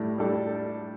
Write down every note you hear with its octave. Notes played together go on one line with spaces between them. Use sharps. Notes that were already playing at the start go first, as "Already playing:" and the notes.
Already playing: A2 G3 D4
G3 D4 A4